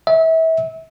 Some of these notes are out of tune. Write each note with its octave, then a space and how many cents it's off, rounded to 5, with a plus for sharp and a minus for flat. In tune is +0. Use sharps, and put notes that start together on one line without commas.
E5 -30